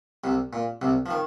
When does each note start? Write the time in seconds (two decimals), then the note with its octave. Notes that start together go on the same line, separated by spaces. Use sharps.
0.24 C2 C3
0.53 A#2
0.82 C2 C3
1.06 F3
1.11 D#3